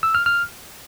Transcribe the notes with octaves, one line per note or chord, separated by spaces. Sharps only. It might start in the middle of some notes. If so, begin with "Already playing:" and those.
E6
F6
F6